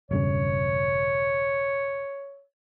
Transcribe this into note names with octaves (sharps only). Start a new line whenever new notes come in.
E1 G2 C#3 C#5